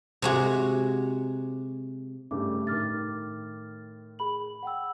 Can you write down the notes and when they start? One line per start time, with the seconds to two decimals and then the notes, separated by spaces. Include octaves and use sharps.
0.22 C3 G#3 F#4
2.31 G2 C#3 A3 D6
2.67 A2 D#3 D6 F6 A6
4.19 G#4 B5 F#7
4.63 F#5 G5 E6